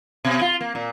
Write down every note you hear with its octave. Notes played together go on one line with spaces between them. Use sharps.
B2
F4
A#3
A#2